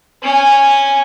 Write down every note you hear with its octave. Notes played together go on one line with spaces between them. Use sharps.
C#4 G#5